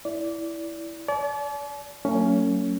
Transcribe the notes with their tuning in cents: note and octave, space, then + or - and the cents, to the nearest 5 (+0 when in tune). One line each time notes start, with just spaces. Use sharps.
E4 +0 D5 -20
D5 -35 A5 -45
F#3 +0 A#3 -45 C#4 +15